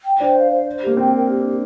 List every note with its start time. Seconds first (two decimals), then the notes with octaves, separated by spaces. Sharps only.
0.05 G5
0.20 D4 C5
0.35 F5
0.51 C5
0.66 C5
0.82 A#3 G4
0.97 C4 G5
1.12 A#4
1.28 G4
1.43 D4